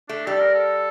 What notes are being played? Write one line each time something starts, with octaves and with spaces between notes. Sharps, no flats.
A3 D4
G3 A4
A#4
A4